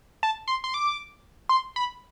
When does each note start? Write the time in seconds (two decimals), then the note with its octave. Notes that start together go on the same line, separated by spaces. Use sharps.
0.23 A5
0.48 C6
0.64 C6
0.74 D6
1.49 C6
1.76 B5